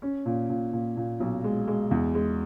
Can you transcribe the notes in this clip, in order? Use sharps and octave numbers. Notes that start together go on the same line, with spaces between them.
C#4
A#2
A#2
A#2
A#2
B1
G#3
G#3
E2
G#3